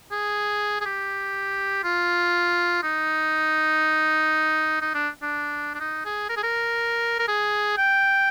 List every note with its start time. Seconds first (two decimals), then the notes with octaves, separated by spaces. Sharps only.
0.11 G#4
0.81 G#4
0.86 G4
1.84 F4
2.83 D#4
4.82 D#4
4.95 D4
5.22 D4
5.74 D4
5.80 D#4
6.05 G#4
6.29 A#4
6.37 G#4
6.43 A#4
7.19 A#4
7.28 G#4
7.78 G5